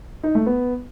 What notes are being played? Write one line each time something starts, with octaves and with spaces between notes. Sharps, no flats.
D#4
A3
B3